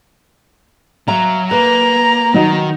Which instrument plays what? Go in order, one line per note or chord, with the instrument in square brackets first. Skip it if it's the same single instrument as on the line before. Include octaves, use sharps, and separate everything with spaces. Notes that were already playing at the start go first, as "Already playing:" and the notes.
[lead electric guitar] F#3 [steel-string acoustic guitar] E5 F5 A#5
[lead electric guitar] A#3 [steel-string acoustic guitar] B4 [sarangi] A#5
[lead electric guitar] D#3 [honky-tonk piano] F#3 D#4 F#4